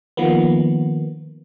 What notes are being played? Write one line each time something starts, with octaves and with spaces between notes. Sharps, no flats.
D#3 F3 A#3 B3